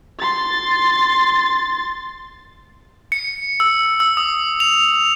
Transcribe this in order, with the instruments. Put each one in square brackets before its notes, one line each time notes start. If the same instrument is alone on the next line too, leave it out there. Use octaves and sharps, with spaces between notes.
[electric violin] C6 A6
[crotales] C#7
E6
E6
D#6
F7